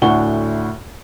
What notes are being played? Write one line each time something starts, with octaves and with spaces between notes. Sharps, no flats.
D2 A2 D4 F#5 C#6 G7